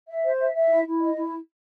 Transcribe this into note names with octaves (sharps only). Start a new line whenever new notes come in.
E5
C5
E5
E5
E4
E4
D#5
E4